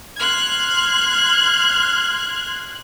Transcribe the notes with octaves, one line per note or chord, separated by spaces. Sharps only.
C6 F6 F#6 G#6